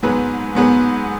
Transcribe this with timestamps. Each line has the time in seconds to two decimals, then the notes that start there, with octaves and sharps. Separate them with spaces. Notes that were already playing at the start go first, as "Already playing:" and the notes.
0.03 G#2 F#3 B3 G#4 B4
0.55 G#2 F#3 B3 G#4 B4